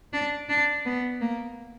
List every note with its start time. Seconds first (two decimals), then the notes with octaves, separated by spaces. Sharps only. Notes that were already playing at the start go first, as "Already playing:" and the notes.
0.13 D4
0.49 D4
0.85 B3
1.21 A#3